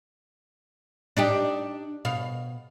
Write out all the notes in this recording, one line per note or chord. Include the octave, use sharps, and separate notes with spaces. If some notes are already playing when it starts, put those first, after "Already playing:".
D4 D#4 G4
B2 F5